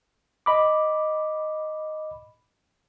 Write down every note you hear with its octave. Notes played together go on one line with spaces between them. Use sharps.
D#5 B5 D6